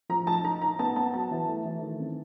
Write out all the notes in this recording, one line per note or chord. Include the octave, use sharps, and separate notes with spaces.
F3 A#5
D#4 A5
D#4 A#5
D#4 A#5
B3 A5
B3 A5
F#3 A5
E3
A3
E3
D#3
C4